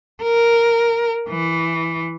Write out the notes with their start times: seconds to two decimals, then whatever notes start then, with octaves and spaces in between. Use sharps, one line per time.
0.22 A#4
1.29 E3